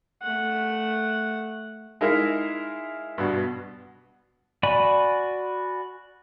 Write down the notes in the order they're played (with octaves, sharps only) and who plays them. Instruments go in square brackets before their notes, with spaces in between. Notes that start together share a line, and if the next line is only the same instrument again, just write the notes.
[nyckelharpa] A3 F#5
[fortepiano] G#3 D#4 E4 A#4 E5 F5
G2 B2
[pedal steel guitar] F#4 D5 G#5 B5